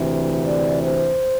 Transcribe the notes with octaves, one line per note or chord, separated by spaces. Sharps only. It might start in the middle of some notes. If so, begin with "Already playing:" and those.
Already playing: D2 C3 E3
D5
C5